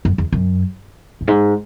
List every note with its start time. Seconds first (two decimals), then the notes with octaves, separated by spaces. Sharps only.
0.05 F#2
0.18 E2
0.32 F#2
1.21 F#2
1.28 G#2